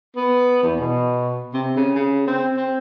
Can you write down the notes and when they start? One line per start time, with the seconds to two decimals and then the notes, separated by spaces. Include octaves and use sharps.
0.16 B3
0.63 E2
0.80 B2
1.54 C3
1.77 C#3
1.96 C#3
2.27 C4
2.57 C4